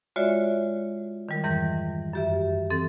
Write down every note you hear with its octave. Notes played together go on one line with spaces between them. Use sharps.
G#3 F4 F#4 C#5 D5 E5
D#3 G3 A#4
F2 G#2 E3 G6 A#6
F#2 G4 E5
E3 C4 A4 A6